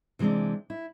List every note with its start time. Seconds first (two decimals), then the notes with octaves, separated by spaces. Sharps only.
0.19 C3 E3 G#3 C4 D4
0.70 E4